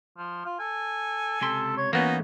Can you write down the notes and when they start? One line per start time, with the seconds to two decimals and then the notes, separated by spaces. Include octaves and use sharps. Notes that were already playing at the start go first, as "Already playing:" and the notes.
0.18 F3
0.46 F4
0.60 A4 G#5
1.41 C#2 C3 A4 C6
1.77 C#5
1.93 E3 A#3 B3 C#4 D#4 F#4